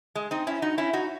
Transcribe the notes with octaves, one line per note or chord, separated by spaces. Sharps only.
G#3
C4 D#4
C#4 E4
D#4 F#4
C#4 E4
D#4 F#4